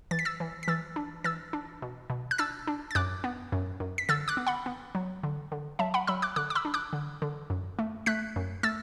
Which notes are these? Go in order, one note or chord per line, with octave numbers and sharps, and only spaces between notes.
E3 A6
B6
E6 A6
E3
B6
E3 E6 A6
D4
E3 E6 A6
D4
B2
B2
F#6
D4 E6 A6
D4
A6
F#2 D6 F#6
B3
F#2
F#2
B6
D3 E6 A6
D6 F#6
B3
F#5 B5
B3
F#3
D3
D3
F#3 E5 A5
F#5 B5
F#3 B5 E6
D6 F#6
D3 D6 F#6
D6
B5 E6
D4
D6 F#6
D3
D3
F#2
A3
A3 F#6 B6
F#2
A3 E6 A6